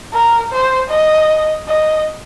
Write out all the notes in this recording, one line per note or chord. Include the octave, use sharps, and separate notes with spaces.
A#4
C5
D#5
D#5